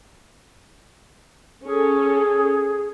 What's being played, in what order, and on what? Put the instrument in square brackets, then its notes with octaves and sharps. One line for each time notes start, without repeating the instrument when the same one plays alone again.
[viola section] C#4 A4 [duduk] G#4